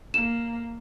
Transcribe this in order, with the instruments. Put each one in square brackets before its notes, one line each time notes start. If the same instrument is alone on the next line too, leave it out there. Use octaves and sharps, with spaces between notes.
[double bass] A#3 [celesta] E7